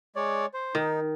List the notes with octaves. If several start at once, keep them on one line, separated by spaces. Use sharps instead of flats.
G#3 C#5 D5
C5
D#3 D#4